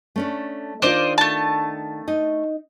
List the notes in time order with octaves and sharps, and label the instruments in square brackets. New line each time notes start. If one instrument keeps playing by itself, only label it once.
[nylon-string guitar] A3 C#4 D4
[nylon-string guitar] D#3 D4 F4 [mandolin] C5 D5 D#5
[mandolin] A3 A5
[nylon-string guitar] D#4 D#5